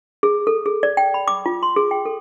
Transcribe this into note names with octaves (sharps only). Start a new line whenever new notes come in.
G#4
A4
G#4
D5
G5
B5
D6
F4
C6
G#4
G5
A4